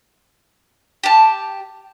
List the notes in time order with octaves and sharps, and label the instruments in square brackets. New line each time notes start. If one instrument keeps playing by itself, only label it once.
[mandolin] G4 A5